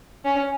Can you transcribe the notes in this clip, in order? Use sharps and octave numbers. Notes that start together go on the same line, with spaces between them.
C#4